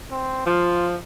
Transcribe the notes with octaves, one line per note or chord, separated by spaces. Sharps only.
C4
F3 F4